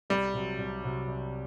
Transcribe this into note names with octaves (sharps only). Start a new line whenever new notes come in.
C2 G3
C3 F#3
C2
C3 F#3
C2